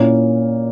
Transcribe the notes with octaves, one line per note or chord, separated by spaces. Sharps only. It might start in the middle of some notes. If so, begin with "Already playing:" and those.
Already playing: A#2 A#3 C#4 E4